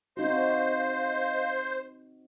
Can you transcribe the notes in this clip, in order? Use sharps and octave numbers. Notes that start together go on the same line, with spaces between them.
C4 D#4 F#4 C5 D#5 F5